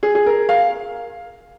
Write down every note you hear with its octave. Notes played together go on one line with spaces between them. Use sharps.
G#4
G#4
A#4
F5